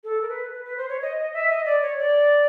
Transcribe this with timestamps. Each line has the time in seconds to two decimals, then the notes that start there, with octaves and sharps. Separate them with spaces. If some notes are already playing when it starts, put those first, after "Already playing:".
0.04 A4
0.22 A#4
0.29 B4
0.53 B4
0.65 B4
0.77 C5
0.89 C#5
1.02 D#5
1.17 D#5
1.34 E5
1.50 D#5
1.66 D5
1.82 C#5
1.98 D5